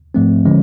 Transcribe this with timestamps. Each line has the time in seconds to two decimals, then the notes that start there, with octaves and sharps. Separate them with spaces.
0.14 G#2 F3 A3 C4
0.45 D3 F3 G#3 C#4